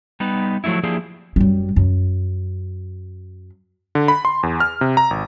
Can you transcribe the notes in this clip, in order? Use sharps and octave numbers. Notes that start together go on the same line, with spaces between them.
G3 B3 D#4 B4
F3 F#3 A3 D#4 E4
F3 A#3 D4 E4 G4 G#4
F#2 G3
F#2
D3
B5
C6
E2
F6
C3
A#5
G#1